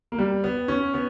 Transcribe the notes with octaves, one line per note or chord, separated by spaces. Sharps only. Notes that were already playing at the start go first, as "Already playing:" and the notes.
A#3
G3
B3
C#4
B3